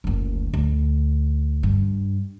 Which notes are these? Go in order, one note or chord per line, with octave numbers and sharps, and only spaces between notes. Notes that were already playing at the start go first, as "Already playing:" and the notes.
F#1 D2
D2
G2